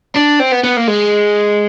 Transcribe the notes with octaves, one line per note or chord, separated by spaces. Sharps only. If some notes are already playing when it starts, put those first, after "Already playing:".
D4
C4
B3
B3
A#3
G#3